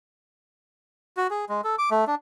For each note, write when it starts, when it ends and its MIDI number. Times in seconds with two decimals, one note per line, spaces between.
1.17 1.27 66
1.31 1.45 68
1.49 1.61 56
1.64 1.76 69
1.79 1.89 86
1.91 2.05 57
2.07 2.15 62